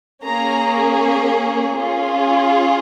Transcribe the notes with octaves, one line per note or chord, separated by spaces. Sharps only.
A#3 C#4 G#4 A#5
C#4 F4 G#4